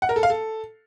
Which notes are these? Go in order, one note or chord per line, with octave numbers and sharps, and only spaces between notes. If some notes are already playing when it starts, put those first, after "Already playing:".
F#5
A#4
A4
F5
A4